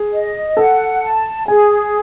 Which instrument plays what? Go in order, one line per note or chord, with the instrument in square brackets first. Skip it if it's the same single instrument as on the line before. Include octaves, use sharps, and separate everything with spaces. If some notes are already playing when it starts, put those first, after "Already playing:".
Already playing: [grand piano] G#4
[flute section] D#5
[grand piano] A4 [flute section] F#5
[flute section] A5
[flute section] G#4 [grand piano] G#5